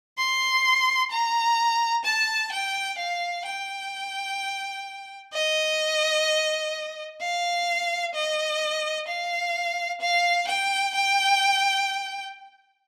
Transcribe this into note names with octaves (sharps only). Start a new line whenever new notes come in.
C6
A#5
A5
G5
F5
G5
D#5
F5
D#5
F5
F5
G5
G5